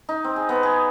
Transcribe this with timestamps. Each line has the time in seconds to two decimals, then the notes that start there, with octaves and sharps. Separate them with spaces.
0.09 D#4
0.24 C4
0.36 G#4
0.49 B3
0.63 G#4